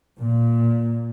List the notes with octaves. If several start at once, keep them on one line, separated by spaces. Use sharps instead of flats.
A#2